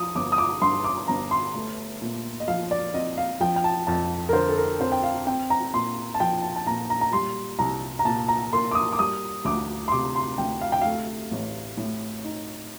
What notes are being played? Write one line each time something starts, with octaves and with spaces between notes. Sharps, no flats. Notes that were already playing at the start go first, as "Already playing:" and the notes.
Already playing: F3 D#6
G1 D6
D#6
D6
G2 C6
D6
G1 A#5
C6
A3
A#2
D#5
F3 F5
D5
C4 D#5
F5
F3 G5
G5
A5
F2 A5
A#4
D3 C5
A4
A#4
C4 C5
G5
F5
C4 G5
A#5
A#2 C6
A5
F3 G5
A5
A5
A#2 A#5
A#5
A#5
G3 C6
C2 A#5
A#5
A#2 A5
A#5
A#3 C6
D6
D#6
D6
G3 D#6
D2 D6
C6
C3 D6
C6
D2 G5
F5
G5
A3 F5
A1
A2
D#4